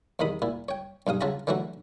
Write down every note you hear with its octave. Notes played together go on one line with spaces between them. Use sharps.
E2 C3 D#3 B5 D#6
A#2 E4
C#5 G5
B1 G2 F5 D#6
C#3 F4 F#4 E5 A5 A#5
D3 E3 F#3 A3 F#4